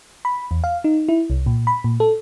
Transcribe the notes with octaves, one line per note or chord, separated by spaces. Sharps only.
B5
E2
F5
D#4
E4
C2
A#2
B5
A#2
A4